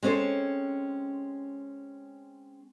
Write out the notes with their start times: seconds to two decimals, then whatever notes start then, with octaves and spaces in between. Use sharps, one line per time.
0.03 G#3 C4 C#4 A4 C#5